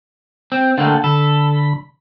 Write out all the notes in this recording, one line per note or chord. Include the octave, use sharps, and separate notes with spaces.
C4
D3 A3 A#3 F#5 G5 A5
D3 A4 B5